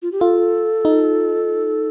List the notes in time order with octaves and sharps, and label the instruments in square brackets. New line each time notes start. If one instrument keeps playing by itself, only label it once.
[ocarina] F4
G4
[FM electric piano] F4 [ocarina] A4
[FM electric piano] D#4